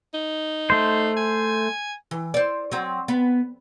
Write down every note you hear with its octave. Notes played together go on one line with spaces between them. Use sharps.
D#4
A3 C5
G#5
E3
C5 D5
F#3 C4
B3